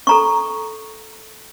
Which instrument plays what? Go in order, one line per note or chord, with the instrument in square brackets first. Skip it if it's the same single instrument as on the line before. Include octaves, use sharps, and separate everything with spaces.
[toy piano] A4 A#5 C#6